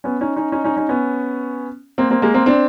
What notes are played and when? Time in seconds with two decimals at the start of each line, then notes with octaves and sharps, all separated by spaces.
0.04 B3 C#4
0.21 C#4 D#4
0.36 C#4 D#4
0.52 C#4 D#4
0.64 C#4 D#4
0.77 C#4 D#4
0.89 B3 C#4
1.98 A#3 C4
2.10 A#3 C4
2.22 G#3 A#3
2.34 A#3 C4
2.46 C4 D4